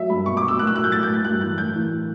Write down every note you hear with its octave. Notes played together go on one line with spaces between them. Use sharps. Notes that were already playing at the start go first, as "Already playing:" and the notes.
Already playing: F#3 E5
G2 B5
B2 C#6
D6
B2
E6
A2 F#6
E6
A2 F#6
G6
A2 A6
G6
A2
G6
G2 F#6
E3 F#6
A2 G6
E3